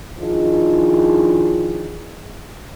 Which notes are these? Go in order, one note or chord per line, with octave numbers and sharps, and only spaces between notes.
D#3 F3 D4 E4 G#4